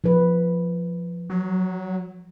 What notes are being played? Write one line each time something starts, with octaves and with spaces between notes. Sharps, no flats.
F3 B4
F#3